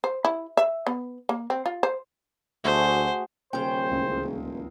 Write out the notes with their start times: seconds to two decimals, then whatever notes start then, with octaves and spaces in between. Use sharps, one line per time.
0.04 C5
0.25 E4
0.57 E5
0.87 B3
1.29 A#3
1.50 C4
1.66 F4
1.83 C5
2.64 D2 A3 F#4 G#4 C5
3.53 D#1 C#3 C5 G5
3.90 D1 C#2
4.22 E1